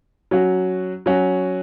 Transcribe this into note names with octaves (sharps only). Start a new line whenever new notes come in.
F#3 C#4 F#4
F#3 C#4 F#4